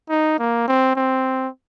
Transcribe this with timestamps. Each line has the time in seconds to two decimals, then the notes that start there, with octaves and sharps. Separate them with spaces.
0.10 D#4
0.39 A#3
0.68 C4
0.96 C4